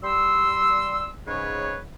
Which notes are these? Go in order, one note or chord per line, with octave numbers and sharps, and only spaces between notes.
G3 C6 E6
G#2 C#3 G#4 B4 C#5